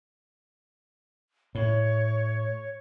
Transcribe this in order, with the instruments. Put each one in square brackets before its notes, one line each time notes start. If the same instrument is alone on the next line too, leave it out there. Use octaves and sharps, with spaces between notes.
[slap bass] A2 [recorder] C#5